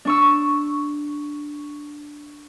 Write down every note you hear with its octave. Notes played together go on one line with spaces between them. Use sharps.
D4 C#6 E6